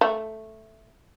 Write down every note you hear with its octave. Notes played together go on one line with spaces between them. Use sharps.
A3